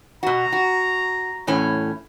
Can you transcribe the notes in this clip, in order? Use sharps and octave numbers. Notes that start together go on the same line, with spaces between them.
B2 F#4 A#5
F#4
E2 A2 C#4